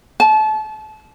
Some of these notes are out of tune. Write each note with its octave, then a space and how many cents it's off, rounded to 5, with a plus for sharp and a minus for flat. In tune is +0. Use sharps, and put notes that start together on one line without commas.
A5 -30